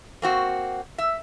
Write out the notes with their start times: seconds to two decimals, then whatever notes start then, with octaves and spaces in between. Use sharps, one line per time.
0.22 A#3 C4 F#4
0.98 E5